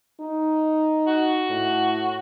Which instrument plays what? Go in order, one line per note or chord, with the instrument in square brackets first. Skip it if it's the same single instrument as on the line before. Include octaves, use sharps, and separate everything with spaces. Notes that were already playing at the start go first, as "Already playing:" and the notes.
[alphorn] D#4
[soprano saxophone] F#4
[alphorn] A2